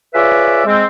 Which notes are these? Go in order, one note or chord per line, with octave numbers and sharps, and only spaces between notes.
F4 G#4 B4 C#5 D5 E5
G#3 C4